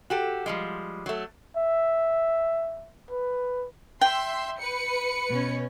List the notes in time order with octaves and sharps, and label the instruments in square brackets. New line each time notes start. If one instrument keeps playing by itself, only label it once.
[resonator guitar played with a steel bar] F#4 G4 A4
F3 G3 G#3
F#3 A3
[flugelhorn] E5
B4
[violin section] E5 C6 [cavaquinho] G5
[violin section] B4 C#7
[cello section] B2 C#4